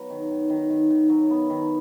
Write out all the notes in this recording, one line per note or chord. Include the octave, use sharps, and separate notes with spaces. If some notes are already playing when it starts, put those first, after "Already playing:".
Already playing: F#3 B3
D#3
D#3
D#3
D#3
D#3
F#3
B3
D#3